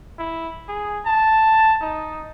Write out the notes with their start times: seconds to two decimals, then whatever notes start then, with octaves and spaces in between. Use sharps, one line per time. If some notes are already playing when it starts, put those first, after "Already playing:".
0.19 E4
0.68 G#4
1.06 A5
1.81 D#4